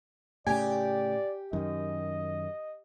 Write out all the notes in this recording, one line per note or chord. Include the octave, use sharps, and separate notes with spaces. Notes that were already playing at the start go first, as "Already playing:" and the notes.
A2 C#3 G4 D5 G#5
F#2 D#3 D#5